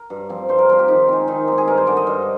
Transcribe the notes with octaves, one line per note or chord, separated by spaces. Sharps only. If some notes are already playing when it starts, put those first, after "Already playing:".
Already playing: A#4
G2
F3 C4
G2 C5
A#4
F3 C4 A#4
G4
D#3 D#4
G#3 C4
D#3 D#4
G#3 C4 G4
G#4
G2 A#4
C5
D3 G#3 C4 D5
D#5
G2